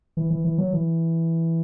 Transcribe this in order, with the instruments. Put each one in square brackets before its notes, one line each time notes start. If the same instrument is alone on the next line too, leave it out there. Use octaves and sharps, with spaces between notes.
[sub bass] E3
E3
E3
F#3
E3